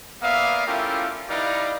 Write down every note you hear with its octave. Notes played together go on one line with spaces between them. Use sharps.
A#3 B3 D5 E5 F5 D#6
A3 C#4 E4 F4 G4 A#4
G3 D#4 E4 B4 D5 F5